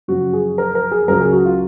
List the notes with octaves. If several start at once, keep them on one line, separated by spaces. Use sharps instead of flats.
F#2 C#3 F3 F#4
G#4
A#4
A#4
G#4
C#2 C#3 F#3 A#4
G#4
F#4
F4